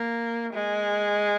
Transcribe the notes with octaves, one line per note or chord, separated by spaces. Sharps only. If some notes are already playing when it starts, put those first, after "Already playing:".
Already playing: A#3
G#3